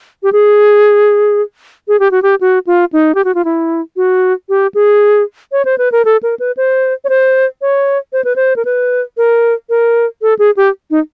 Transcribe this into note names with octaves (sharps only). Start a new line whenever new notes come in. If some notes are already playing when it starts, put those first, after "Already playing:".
G4
G#4
G#4
G4
F#4
G4
F#4
F4
D#4
G4
F#4
F4
E4
F#4
G4
G#4
C#5
C5
B4
A#4
A4
A#4
B4
C5
C#5
C5
C#5
C5
B4
C5
A#4
B4
A#4
A#4
A4
G#4
G4
D#4